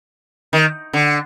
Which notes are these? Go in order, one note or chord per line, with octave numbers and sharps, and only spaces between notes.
D#3
D3